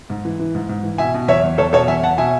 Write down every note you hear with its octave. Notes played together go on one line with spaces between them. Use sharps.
G#2
E3
E3
G#2
G#2
E3
B2 E5 G#5
B2
E2 C#5 E5
E2
E2 A4 C#5
B2 A4 C#5
E2 E5 G#5
E2 F#5 A5
B2 E5 G#5